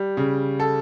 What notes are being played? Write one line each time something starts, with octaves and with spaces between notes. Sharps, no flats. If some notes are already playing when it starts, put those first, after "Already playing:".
Already playing: G3
C#3
A4